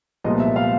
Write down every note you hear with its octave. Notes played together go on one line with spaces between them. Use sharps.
C2 A#2 F3 G#3 B3 D#5
E5
F5